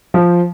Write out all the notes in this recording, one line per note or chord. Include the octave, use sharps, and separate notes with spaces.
F3